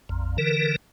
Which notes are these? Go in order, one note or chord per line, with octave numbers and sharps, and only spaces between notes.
A#1 F2
D3 E3 A#4